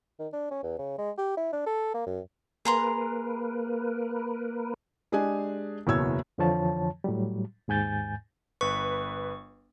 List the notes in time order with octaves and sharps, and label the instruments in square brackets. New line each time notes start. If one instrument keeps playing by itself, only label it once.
[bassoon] D#3
D4
C#4
E2
C#3
G#3
G4
E4
D4
A4
A#3
F#2
[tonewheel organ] A#3 A#4 B4 [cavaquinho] G#4 A#5 C6
[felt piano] G#3 D4 G4 G#4 D#5 G#5
F#1 E2 B2 C#5 E6 G#6
[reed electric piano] F2 D3 E3 F3 C#5 A5
A2 F#3 G3
D#2 G#2 G#5 G6 A6
[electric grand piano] G1 B4 [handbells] C#6